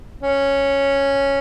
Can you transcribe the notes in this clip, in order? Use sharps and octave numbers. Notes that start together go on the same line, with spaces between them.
C#4